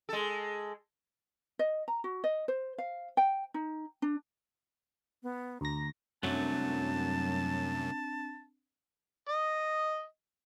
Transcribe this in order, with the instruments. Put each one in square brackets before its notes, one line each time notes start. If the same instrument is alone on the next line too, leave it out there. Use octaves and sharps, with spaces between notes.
[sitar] G#3 A4
[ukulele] D#5
A#5
F#4
D#5
C5
F5
G5
D#4
D4
[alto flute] B3
[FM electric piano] D2 A#6 [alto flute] A#5
[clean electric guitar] C2 F#3 A3 [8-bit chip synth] F#2 [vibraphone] C4 D4 [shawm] A5
[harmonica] D#5